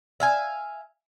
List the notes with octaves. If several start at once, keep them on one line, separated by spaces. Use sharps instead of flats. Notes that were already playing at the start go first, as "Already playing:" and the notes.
E5 F5 G#5